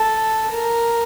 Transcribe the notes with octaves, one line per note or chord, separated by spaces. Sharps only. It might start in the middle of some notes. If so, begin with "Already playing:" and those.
Already playing: A4
A#4